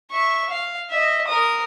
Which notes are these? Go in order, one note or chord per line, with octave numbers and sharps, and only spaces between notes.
E5 C#6
F5
D#5 E5
A#4 D#6